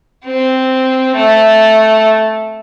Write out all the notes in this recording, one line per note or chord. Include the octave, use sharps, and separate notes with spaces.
C4
A3